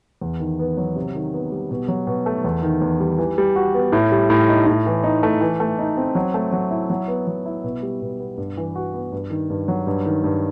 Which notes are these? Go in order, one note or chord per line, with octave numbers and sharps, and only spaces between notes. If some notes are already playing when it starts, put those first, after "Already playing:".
E2
D#3
B3
F#3
C3
D#3
B3
G3
B2
F#3
B2
A3
E2
D#3
E2
G3
E3
G3
F#4
B3
A2
G3
A2
D#4
A2
E3
D#4
A3
E3
A3
D#4
C4
F#3
A3
F#3
E4
F#3
B3
F#3
E4
B2
G3
B2
B3
G2
E3
F#4
B3
G2
D#3
G2
F#3
G2
D#3
G2